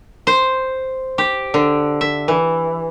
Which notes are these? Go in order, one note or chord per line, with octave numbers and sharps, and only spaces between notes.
C5
G4
D3
E5
E3